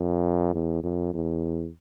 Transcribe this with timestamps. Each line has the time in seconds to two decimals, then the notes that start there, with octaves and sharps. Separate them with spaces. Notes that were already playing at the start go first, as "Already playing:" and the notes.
Already playing: F2
0.54 E2
0.83 F2
1.14 E2